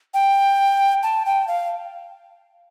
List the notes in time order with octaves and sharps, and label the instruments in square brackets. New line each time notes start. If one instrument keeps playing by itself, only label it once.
[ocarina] G5
A5
G5
F5